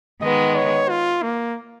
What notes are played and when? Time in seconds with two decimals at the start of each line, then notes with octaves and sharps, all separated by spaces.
0.21 D#3 G#3 B3 D#5
0.56 C#5
0.89 F4
1.23 A#3